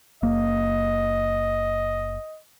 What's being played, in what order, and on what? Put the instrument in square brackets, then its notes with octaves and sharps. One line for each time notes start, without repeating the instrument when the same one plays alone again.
[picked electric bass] F#1 A#3 [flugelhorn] D#5